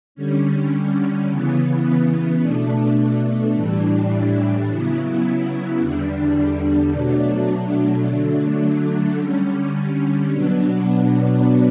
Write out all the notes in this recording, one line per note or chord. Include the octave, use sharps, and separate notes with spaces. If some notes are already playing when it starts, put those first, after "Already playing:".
D3 G3 C#4
C#3 E3 B3
B2 A3 D4
A2 E3 G3 D4
C#3 F#3 B3 E4
E2 D3 G3 D4
B2 F#3 A3 D4
D3 F#3 A3 D4
D3 G3 C#4
B2 F#3 B3 D4